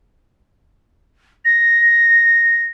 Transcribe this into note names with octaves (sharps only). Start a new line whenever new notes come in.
A#6